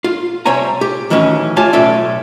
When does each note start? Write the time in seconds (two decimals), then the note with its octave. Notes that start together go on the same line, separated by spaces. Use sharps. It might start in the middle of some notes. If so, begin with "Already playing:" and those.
0.04 F4
0.46 C3 G3 C4 C#5 G#5 A#5
0.81 G4
1.10 A2 D#3 E3 F#3 C#4
1.56 A3 F4 G4 C#5 G#5 A5
1.73 B1 A2 C#4 D5 E5